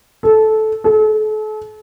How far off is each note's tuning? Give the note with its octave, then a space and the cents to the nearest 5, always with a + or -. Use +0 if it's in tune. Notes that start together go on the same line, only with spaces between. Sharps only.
A4 -15
A4 -40